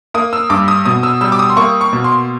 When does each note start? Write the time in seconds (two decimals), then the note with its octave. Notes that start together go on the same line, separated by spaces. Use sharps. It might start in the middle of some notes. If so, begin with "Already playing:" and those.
0.14 A#3 D#6
0.33 E6
0.50 G2 D6
0.68 D#6
0.85 B2 D#6
1.03 E6
1.21 G3 E6
1.32 D6
1.39 D#6
1.50 C6
1.57 A#3 C#6
1.81 C#6
1.93 B2
2.04 C6